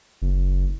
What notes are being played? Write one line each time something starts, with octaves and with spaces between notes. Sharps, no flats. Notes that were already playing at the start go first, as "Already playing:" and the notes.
F#1